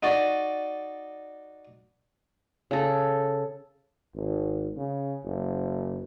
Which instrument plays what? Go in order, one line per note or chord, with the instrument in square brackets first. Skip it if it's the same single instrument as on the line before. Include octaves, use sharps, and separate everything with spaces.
[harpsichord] D#4 F#4 D5
[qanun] C#3 A4
[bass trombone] G#1
C#3
F#1